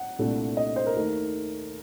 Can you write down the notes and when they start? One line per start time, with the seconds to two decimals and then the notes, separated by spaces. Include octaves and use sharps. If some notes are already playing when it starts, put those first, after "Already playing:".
Already playing: F#5
0.19 C2 A#2 A3 D4
0.57 D#5
0.76 C5
0.86 A#4
0.96 D#2 D#3 A3 D#4